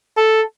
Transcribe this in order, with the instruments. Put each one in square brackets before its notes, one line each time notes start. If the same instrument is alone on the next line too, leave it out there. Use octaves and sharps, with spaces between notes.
[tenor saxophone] A4